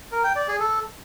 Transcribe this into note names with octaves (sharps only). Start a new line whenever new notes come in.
A#4
G5
D5
G#4
A4